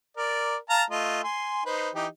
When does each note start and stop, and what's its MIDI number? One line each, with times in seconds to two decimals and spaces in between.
0.17 0.56 70
0.17 0.56 74
0.70 0.83 77
0.70 0.83 81
0.70 0.83 82
0.90 1.21 57
0.90 1.21 65
0.90 1.21 75
1.24 1.63 80
1.24 1.63 84
1.66 1.90 63
1.66 1.90 71
1.66 1.90 72
1.95 2.07 52
1.95 2.07 63
1.95 2.07 67